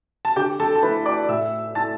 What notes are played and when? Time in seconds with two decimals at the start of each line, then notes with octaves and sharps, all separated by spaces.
0.25 A5
0.36 D3 G4 G5
0.60 A4 A5
0.75 A5
0.83 E4 B4 B5
0.87 A3
1.06 D5 D6
1.29 A2 E5 E6
1.74 A3 E4 A5 A6